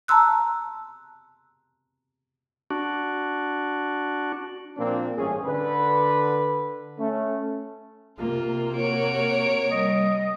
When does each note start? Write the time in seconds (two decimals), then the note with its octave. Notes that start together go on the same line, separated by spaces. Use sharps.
0.08 A5 A#5 C6 E6 F#6
2.71 D4 F#4
4.78 A#2 F3 A#3 C4 D4
5.16 A1 G2 C#4 G#4
5.46 D3 B4
6.98 A3 C#4
8.19 C3 A#3 F4
8.77 F#4 C#5 D7
9.71 G3 D#5